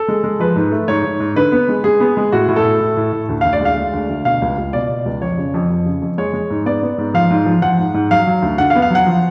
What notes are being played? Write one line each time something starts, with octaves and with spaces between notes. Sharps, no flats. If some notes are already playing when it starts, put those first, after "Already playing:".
Already playing: A4
G#3
G#3
F3 B4
G#2
A3
G#2 C#5
G#2
G#2
D3 B4
B3
G#3
G#3 G#4
B3
G#3
A2 F#4
A2
A4
A2
A2
A2
A2
D2
D2 F5
D5
G#3 F5
G#3
D2
D2
B2 F5
C#2
C#2
B2 D5
B2
C#2
F2 C#5
C#3
F2
F2
C#3
F2
G#3 C#5
G#3
G#2
B3 D5
B3
G#2
F3 F5
G#2
F3
F3 F#5
G#2
G#2
F#3 F5
F#3
D2
D3 F#5
F5
B3
F5
F#3 F#5
F3